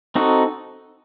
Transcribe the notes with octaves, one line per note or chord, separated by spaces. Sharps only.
C4 D#4 F#4 A4